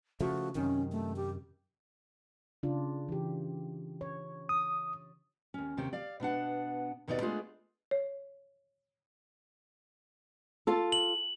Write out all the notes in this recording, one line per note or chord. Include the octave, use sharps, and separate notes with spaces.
C#3 F3 A3 F#4
F#2 C3 D#3 C#4
A3
G4
C#3 D4 F4
E3 G4
C#5
D#6
D#2 C#4
D#2 C3 C#4 G5
D5 F5
B2 B3 D4 F#5
D#2 B2 B3 D#4 G#4 D5
G#3 A3 B3 D4 F4 G#4
C#5
F4 A4
F#7